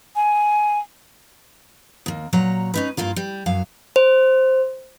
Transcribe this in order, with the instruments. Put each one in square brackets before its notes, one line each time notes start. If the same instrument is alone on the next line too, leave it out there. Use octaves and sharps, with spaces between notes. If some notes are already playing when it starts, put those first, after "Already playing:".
[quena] G#5
[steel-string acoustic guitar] D#2 A#3
A#2 F#3 C#5 A#5
C#4 D#4 B4
G2 A#3 F4 A#4
G3
F#2 F#3 F5
[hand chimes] C5